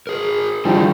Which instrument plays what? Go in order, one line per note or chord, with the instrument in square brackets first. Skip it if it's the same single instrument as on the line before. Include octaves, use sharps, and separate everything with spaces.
[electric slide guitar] G#4 A#4
[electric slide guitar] D#3 D4 [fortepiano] F3 G3 G5